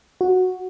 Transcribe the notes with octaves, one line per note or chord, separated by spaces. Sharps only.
F#4